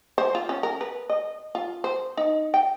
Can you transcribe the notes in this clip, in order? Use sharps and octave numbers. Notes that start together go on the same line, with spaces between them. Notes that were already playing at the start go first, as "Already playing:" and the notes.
C5
F4
C#4
A#4
B4
D#5
F4
C5
D#4
G5